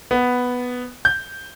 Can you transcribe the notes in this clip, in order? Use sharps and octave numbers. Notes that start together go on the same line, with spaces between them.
B3
G6